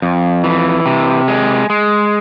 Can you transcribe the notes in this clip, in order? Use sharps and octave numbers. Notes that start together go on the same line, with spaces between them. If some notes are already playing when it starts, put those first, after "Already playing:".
F2
E3
C3
G#3
G#3